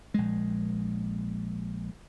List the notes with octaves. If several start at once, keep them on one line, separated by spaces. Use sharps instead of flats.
A#1 G#3